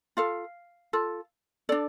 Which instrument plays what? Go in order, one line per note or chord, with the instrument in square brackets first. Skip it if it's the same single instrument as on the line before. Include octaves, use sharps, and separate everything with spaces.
[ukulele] F4 A4 F5
F4 A4
D4 A4 D5